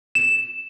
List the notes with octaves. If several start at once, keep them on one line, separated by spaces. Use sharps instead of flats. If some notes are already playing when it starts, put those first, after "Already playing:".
E7